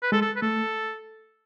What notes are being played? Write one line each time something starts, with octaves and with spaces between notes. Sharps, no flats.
B4
G#3 A4
A4
B4
A3 A4